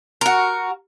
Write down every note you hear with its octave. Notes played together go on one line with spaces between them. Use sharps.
F#4 A#4